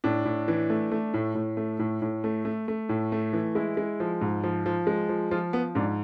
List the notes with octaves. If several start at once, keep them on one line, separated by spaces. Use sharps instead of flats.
A2 D4
A2
E3
A3
A3
A2
A2
A3
A2
A2
A3
A3
A3
A2
A3
E3
G#3 E4
G#3
F3
G#2
F3
F3
G#3
F3
F3 F4
F3 B3
G#2 D4